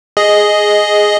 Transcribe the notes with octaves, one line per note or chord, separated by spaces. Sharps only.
G#4 D#5